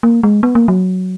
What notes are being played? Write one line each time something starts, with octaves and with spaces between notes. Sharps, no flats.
A#3
G#3
B3
A#3
F#3